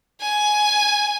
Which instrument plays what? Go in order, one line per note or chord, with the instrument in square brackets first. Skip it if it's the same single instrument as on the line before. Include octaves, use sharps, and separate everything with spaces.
[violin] G#5